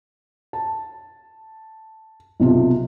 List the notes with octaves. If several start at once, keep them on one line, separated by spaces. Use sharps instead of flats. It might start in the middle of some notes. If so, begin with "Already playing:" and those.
A5
B1 C3 F4